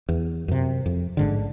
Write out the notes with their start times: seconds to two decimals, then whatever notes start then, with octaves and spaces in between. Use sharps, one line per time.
0.09 E2
0.48 F#2 C3
0.86 F2
1.17 A1 G#2 D3